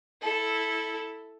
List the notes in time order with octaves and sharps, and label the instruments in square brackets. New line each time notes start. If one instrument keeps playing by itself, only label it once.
[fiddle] E4 A4